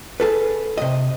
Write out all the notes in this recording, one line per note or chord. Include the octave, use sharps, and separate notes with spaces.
G#4 A4 B4
C3 D#5